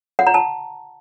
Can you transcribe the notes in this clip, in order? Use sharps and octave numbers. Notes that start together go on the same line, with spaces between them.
F#5
A#5
A5